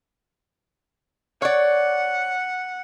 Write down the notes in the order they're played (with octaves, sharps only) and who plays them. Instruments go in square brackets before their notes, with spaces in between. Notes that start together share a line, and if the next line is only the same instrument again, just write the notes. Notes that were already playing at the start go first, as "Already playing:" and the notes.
[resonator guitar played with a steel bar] C#5 D5 [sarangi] F#5